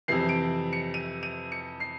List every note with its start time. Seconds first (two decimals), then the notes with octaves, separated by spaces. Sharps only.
0.08 F2 C3 E3 C7
0.29 D7
0.73 C#7
0.94 D#7
1.23 D#7
1.52 C#7
1.80 C7